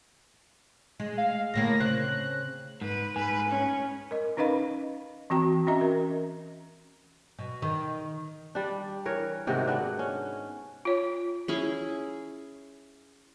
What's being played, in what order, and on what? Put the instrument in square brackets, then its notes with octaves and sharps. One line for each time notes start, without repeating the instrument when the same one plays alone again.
[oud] G#3
[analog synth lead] F5
[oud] D2 A2 A#3 [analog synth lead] A#6
[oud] C#3 C4 [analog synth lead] F#6
[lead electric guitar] G#2 [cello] B4
[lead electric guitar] G#2 [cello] B4 [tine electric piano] G#5
[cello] C#4
[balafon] A#4 D#5
C#4 D#4 B4 D#5 F5 B5
E3 C4 F#4 G5 A#5
C#4 F#4 D#5 E5 A#5
A#4
[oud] B2
D#3
[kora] G3 D4
E3 A#4 C#5
G#2 C3 D#3 F#4
B3 D4
C#4
[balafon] F4 C#5
[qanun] C#4 E4 G#4